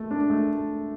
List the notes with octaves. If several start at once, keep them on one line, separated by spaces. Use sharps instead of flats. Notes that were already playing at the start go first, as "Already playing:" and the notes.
Already playing: A3 A4
D4
A3